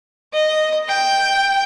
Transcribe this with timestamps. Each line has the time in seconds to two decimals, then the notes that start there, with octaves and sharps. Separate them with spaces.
0.34 D#5
0.89 G5